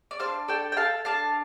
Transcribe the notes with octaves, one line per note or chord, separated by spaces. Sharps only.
D5
D4 C5 F5
A4 D5 G5
G5
A4 F5 A5
D4 F5 A5